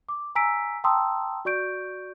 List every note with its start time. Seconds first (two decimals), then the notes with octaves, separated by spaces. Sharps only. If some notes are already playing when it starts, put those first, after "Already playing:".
0.09 D6
0.35 G#5 A#5 E6 B6 D7
0.84 G5 A5 A#5 C6 D#6 E6
1.45 F#4 D5 C#6 G6 D7